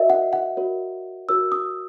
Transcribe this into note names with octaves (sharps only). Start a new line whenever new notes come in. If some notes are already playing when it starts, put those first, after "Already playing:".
Already playing: F#4 A#4 C#5 D#5 E5
F#5
F#5
F#4 A#4 C#5
F#4 A#4 C#5 E6
D#6